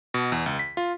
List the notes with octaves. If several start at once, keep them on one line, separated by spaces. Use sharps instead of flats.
B2
E2
C#2
B6
F4